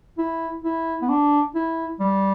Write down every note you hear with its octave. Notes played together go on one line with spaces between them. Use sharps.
E4
E4
B3
D4
E4
G3